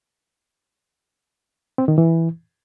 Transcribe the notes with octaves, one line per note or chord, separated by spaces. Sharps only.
C4
D#3
E3